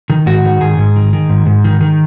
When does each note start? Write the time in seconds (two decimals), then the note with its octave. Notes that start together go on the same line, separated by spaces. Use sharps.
0.10 D#3
0.26 G#2 F#4
0.45 D#3
0.61 G#2 G#4
0.78 G#2
0.96 D#3
1.13 D#3
1.29 G#2
1.46 G#2
1.64 D#3
1.81 D#3